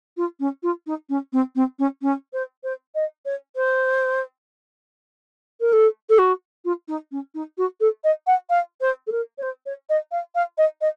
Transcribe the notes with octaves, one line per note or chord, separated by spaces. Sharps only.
F4
C#4
F4
D#4
C#4
C4
C4
C#4
C#4
C5
C5
D#5
C#5
C5
A#4
A4
A4
F#4
F4
D#4
C#4
D#4
F#4
A4
D#5
F#5
F5
C5
A4
A#4
C#5
C5
C#5
D#5
F5
F5
D#5
D#5